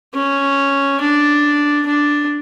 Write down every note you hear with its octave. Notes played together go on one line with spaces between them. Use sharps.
C#4
D4
D4